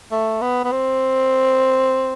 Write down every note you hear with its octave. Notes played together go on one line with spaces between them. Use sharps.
A3
B3
B3
C4